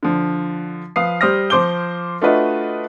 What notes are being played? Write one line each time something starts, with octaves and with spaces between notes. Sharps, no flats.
D3 F3
F3 B4 F5 D#6 C7
G3 C5 D#6 F6 A#6
F3 C5 C6 D6 G6 G7
A3 D4 F4 F#4 B4 D#5